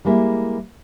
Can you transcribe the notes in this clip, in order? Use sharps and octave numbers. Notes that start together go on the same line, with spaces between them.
G3 G#3 A#3 E4